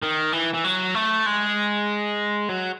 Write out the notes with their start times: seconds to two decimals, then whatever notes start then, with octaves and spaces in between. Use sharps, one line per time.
0.02 D#3
0.32 E3
0.54 E3
0.64 F#3
0.95 A3
1.26 G#3
2.49 F#3